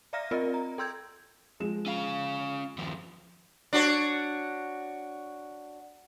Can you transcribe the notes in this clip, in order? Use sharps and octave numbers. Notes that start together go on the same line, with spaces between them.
D5 E5 F5 A#5 F6 A#6
C4 F4 A#4 D5 D#5
A#5
A4 G5 C6 E6 G6 G#6
F3 G#3 E7
C#4 F5
D#2 F3
D4 F#4 C#5